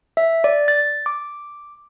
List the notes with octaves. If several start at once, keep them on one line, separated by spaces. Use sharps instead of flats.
E5
D5
A6
D6